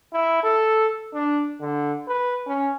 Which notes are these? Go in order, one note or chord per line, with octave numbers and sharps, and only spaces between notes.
E4
A4
D4
D3
B4
C#4